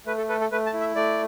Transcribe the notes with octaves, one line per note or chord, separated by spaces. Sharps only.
A3 B4
A4
A4 B4
A4
A3 B4
A5
E4
E5
A3 D5